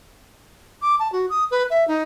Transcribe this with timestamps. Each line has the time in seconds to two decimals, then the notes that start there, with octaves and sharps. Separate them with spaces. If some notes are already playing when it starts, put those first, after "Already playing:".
0.82 D6
0.99 A5
1.12 F#4
1.30 D#6
1.51 B4
1.70 E5
1.88 D#4